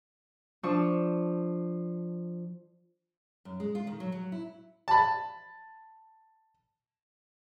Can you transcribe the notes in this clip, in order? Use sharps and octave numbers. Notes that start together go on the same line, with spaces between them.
F3 D4 C#6 E6
F#2
G#3
F4
D#3
F#3
F#3
E4
A5 B5